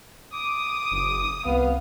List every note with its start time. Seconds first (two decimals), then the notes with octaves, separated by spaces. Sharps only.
0.33 D6 D#6
0.92 F#1
1.46 C2 B3 F5